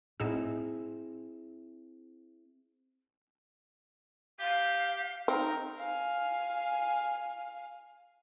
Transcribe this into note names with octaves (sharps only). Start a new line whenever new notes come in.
A2 C4 D#4 E4 G#4 E6
G4 F5
C4 D#4 A#4
F5 G#5